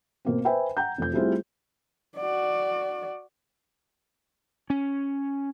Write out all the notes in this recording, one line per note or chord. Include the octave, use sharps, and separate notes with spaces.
B2 A#3 C4
B4 C5 E5 G5 G#5 B5
F#5 G5 A#5 G6
F1 F2 G6
G3 A3 C4 E4 F4 G#4
F#4 D5
C#4